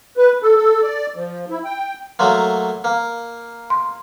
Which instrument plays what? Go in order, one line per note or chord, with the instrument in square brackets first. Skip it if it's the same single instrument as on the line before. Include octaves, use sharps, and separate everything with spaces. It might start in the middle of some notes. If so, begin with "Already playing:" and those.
[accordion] B4
A4
A4
D5
F3
E4
G5
[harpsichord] F#3 A3 A#3 [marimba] C6
[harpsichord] A#3
[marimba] C6